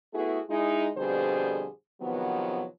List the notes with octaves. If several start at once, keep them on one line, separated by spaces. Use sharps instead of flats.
A3 B3 E4 F#4 G#4 A4
G#3 D#4 E4
F2 B2 D3 G3 G#4 C5
C3 D#3 F3 F#3 B3